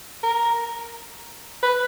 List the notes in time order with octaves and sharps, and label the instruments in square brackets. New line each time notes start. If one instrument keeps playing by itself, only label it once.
[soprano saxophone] A#4
B4